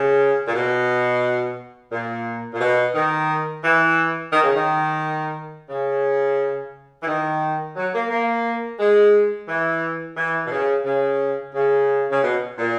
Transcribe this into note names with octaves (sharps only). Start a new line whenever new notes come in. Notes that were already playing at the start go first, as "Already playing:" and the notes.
Already playing: C#3
A#2
B2
A#2
A#2
B2
D#3
E3
D#3
C#3
D#3
C#3
E3
D#3
F#3
A#3
A#3
G#3
E3
E3
B2
C#3
C#3
C#3
C#3
B2
A#2